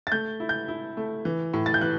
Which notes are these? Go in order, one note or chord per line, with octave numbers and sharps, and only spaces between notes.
A6
A3 G6
E4
G6
E4
A3
E3
A2
A6
G6
E3 F#6